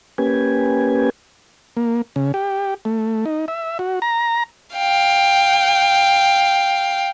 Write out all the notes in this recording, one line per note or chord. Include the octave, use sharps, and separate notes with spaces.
A#3 C#4 G4 B4 G#5
A#3
C#3
G4
A3
D#4
E5
F#4
A#5
F5 G5